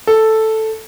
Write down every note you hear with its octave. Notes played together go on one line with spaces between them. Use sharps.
A4